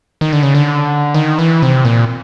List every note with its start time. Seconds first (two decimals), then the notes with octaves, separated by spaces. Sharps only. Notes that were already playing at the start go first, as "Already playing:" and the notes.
0.21 D#3
0.33 D3
0.43 C#3
0.55 D3
1.14 D#3
1.39 E3
1.62 C3
1.85 A#2